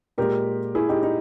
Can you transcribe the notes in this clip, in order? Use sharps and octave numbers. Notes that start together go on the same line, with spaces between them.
A#2 G#3 G4 A#4
E4 G#4
D#4 G4
D#4